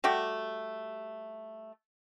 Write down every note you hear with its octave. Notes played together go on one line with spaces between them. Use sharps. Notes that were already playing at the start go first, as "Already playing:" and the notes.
G3 A3 F#4 G4